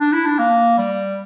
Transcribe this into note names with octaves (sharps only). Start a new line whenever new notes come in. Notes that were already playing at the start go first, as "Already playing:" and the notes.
D4
E4
D4
A#3
G3